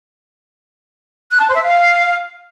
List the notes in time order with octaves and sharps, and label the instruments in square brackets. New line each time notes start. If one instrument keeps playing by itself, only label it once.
[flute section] F#6
A5
C5
E5
F5